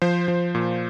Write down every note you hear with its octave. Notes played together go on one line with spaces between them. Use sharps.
F3 C5
F3
A#2